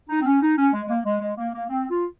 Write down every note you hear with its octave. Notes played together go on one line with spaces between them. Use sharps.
D#4
C4
C#4
D#4
C#4
G#3
G#3
A#3
G#3
G#3
A#3
A#3
C4
F4